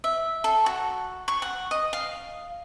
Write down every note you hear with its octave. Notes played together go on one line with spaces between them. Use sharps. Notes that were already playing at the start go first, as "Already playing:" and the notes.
E5
A4
F#4
C#6
F#5
D#5
F5